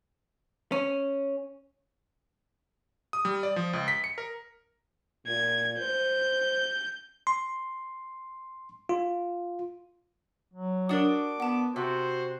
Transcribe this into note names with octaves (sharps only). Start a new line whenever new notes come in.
C#4
D#6
G3
D5
F3
C#2
B6
C#7
A#4
A#2 G#6
C5 G6
C6
F4
F#3
D4 F#4 A#4 D6 D#6
B3 F#5 A5
C3 F#4 C5